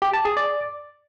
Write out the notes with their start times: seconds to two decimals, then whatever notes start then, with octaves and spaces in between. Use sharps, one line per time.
0.02 G4
0.13 A5
0.25 G#4
0.37 D5